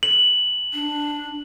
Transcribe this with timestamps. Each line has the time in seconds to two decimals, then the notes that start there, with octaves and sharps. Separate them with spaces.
0.03 F#7
0.74 D4